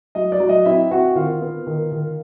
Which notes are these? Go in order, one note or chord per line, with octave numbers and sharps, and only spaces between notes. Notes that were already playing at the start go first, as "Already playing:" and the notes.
F#3 D#5
D5
F#3
D#5
C4 E4 E5
C4 F#4 F#5
D#3 F4 F5
B3
D#3
D#3